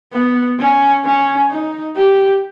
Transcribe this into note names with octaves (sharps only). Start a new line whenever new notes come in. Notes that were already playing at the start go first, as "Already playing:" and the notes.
B3
C#4
C#4
D#4
G4